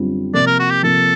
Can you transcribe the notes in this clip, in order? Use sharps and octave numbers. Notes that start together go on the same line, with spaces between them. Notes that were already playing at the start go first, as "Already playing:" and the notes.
Already playing: F#2 D3 G3 C4 F4
C3 F3 A#3 D5
A#4
F#4
G4
C3 F3 A#3 A4